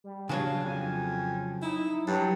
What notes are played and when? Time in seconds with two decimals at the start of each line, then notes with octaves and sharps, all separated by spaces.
0.04 G3
0.29 C#3 F#3 D4 C#5 F5
0.65 F2 G#5
1.62 D#4 E4
2.07 G2 F#3 G5